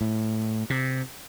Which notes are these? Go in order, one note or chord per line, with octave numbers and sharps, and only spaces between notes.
A2
C3